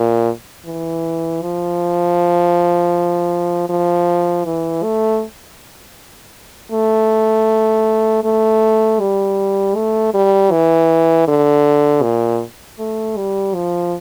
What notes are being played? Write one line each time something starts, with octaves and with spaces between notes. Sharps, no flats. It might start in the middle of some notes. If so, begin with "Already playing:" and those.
Already playing: A#2
E3
F3
F3
E3
A3
A3
A3
G3
A3
G3
E3
D3
A#2
A3
G3
F3